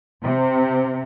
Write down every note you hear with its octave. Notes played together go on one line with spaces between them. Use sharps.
C3